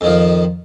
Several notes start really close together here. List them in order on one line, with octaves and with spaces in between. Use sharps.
F2 D#3 F3